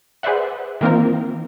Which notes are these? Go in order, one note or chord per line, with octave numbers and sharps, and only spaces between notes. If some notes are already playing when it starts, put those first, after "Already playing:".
G#4 B4 C5 D5 E5 F#5
D#3 E3 A#3 C4 F4 A#4